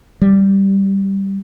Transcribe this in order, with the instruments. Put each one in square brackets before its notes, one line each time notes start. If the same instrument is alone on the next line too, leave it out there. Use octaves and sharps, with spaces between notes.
[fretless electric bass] G3